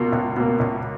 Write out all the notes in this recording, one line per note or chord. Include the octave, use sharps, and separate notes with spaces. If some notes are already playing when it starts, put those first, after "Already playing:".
Already playing: C#2 B2 A#3 F4
C#2
B2 A#3
C#2